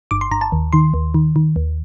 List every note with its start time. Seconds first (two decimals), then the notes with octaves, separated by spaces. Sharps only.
0.11 G1 D6
0.21 C6
0.31 G1 A#5
0.41 A5
0.52 D#2
0.73 D#3 C6
0.94 D#2
1.14 D#3
1.36 D#3
1.56 D#2